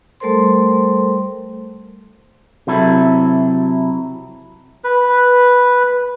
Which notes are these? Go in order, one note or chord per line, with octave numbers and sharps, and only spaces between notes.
G3 A3 A4 A#4 C5 C6
C3 F#3 E4 A4
B4